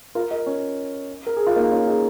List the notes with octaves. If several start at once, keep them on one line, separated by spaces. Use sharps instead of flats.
F4 A#4
A#4 D#5
C#4
A#4
G#4
F4
A#3 D#4
C#4 F4
D#4 G#4